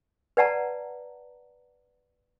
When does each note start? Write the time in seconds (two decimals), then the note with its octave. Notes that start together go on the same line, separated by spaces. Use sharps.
0.37 B4 D5 F#5 A5 A#5